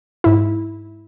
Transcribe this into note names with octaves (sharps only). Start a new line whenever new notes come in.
G#2 E4